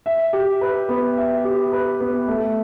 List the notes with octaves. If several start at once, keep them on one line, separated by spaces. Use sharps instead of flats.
E5
G4
B4
B3
E5
G4
B4
B3
A3